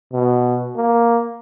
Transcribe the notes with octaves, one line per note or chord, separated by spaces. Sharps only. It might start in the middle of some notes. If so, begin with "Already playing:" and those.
B2
A#3